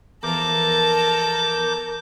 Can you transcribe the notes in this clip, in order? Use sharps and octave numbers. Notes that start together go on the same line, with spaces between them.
E2 F3 A4 A#4 A#5 D6 G6